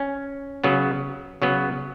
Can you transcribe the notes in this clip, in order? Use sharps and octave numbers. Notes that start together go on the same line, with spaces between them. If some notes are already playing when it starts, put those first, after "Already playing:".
Already playing: C#4
C#3 F#3 B3
C#3 F#3 B3